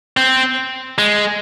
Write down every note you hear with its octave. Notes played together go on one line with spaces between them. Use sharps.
C4
G#3